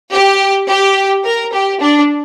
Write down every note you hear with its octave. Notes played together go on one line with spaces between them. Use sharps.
G4
G4
A#4
G4
D4